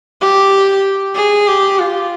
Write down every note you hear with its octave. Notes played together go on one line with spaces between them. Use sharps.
G4
G#4
G4
F4